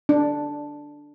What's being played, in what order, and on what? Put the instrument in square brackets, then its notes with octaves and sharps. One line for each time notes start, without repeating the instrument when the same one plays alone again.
[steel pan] D4